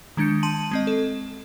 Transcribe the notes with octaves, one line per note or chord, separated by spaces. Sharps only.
D#3 G#3 D4 G6 C#7
A5 C6 D#7 F#7
G#3 C4 D#5
A4